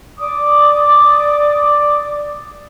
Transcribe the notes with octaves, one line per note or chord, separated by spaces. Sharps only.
D5 D6 D#6